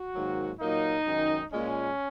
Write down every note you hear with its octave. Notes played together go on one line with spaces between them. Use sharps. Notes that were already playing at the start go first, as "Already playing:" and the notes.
Already playing: F#4
G#2 D#3 F#3 A#3
A#2 F#3 A#3 D#4
F#2 D#3 G#3
A#2 G#3 C#4